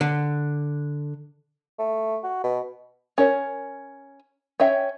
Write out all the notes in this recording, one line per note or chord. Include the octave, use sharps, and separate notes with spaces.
D3
A3
F#4
B2
C#4 A#4 C#5
C#4 C#5 E5 G5